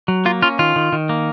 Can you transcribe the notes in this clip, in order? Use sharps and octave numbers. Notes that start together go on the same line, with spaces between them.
F#3
A#3 F4
C#4 F4
D#3 F4
D#3
D#3
A#3